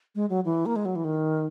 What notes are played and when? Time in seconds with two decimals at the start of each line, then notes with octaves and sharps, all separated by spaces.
0.15 G#3
0.30 F#3
0.45 E3
0.66 A#3
0.76 G#3
0.85 F#3
0.96 E3
1.04 D#3